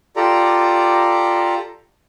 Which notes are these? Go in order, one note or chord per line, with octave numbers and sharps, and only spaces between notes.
F4 G4 A4 D5 A#5